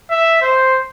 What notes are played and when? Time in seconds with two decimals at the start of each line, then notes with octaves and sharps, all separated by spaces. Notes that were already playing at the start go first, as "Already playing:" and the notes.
0.11 E5
0.42 C5